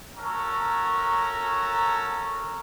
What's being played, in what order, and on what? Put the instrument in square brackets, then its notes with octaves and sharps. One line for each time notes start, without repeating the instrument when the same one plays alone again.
[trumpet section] C#4 F#4 A4 A#4 A#5